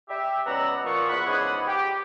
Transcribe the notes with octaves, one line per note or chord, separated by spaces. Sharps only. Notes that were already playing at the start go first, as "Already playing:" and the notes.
G4 E5
C#2 B3 D5 F#5 A#5 E6
A#2 F3 C#6
E2 F#5 B5 C#6
C#2 G#2 E3 B3 G#4 F#5
G4